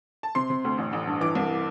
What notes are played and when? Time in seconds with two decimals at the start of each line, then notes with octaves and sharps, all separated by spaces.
0.23 A5
0.35 C3 C6
0.50 C3
0.65 D2
0.78 A1
0.93 A1
1.07 G2
1.21 E3 D6
1.35 C2